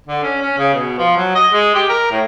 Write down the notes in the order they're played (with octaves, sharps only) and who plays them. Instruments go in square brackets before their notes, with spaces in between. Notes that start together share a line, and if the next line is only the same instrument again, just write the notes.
[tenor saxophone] D3
C#4
C#4
C#3
B2
F3
F#3
D#5
G#3
G4
A#4
A2